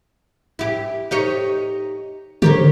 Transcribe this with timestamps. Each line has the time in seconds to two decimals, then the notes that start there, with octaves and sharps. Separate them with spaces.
0.59 E4 G4
1.11 D#4 G4 C#5
2.42 D3 G4 A#4 C#5